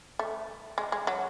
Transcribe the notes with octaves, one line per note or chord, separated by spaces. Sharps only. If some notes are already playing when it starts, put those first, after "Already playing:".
A3
G#3
G#3
F#3